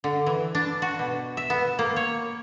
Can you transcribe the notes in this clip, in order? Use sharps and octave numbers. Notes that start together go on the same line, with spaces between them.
D3
E3
D4
F#4
B2
E5
B3
A#3
C#5